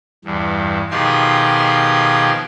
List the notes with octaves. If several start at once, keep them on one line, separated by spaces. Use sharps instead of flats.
E2 G2
B2 D#3 F3 G4 G#4 C6